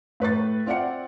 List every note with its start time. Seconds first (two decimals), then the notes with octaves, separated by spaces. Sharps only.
0.20 A2 B4 C#6 A6
0.66 C4 F4 D5 E5 F#5 C#7